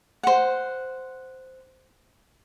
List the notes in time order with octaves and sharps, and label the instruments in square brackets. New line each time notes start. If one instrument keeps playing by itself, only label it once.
[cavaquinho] C5 F#5